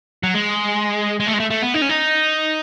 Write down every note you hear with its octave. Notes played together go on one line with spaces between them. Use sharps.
F#3
G#3
G#3
A3
G#3
A3
A3
B3
D#4
C#4
D#4